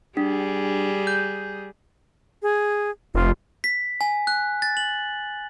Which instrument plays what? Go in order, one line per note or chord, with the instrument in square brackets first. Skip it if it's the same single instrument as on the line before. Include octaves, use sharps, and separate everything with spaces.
[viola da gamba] G3 G#4 [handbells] D4
[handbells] G6
[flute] G#4
[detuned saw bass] F1 [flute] F4
[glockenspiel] B6
G#5
F#6
A6
F#7